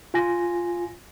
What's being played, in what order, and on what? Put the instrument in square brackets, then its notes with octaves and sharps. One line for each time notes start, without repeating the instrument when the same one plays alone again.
[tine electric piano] F4 G#5 A#6